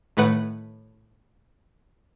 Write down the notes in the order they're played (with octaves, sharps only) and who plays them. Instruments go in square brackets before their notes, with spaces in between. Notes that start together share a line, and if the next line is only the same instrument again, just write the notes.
[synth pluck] A2 D#3 A3 B4 F#5